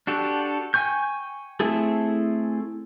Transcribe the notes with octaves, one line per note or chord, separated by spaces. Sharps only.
D4 F#4 G4 A4
G5 G#5 C#6 G6
A3 C4 E4 G#4 A4